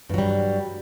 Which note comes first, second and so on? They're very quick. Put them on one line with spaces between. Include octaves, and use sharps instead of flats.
G2 F#3 G3